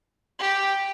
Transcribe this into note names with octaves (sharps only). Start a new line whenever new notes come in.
G4